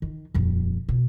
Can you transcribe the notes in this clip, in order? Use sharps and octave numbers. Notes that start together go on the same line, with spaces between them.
D#3
D#1 F2
B2